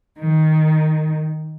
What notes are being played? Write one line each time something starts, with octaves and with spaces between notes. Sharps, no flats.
D#3